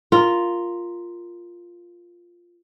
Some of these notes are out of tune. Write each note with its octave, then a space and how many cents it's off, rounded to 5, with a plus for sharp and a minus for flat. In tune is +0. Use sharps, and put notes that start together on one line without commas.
F4 +0 A#4 +0